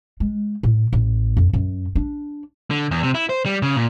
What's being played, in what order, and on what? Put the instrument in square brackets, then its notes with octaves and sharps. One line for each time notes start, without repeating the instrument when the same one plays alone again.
[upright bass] G#3
A2
A1
F2
F#2
D4
[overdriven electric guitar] D3
E2
C3
E4
C5
G3
C#3
A#2